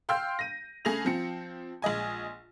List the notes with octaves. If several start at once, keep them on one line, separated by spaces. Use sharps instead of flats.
F5 G5 C6 E6 F6 G6
A#6 D#7
C#3 A3 G#4 G#5 A#6 F7
F3 C4 C#7
A#1 G#3 D#5 G#5